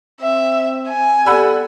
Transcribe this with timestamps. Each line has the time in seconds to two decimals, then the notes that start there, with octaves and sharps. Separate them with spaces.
0.21 C4 E5
0.90 G#5
1.26 G3 B3 A4 F#5 B5 E6